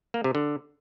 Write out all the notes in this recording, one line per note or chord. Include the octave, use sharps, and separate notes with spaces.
A#3
C3
D3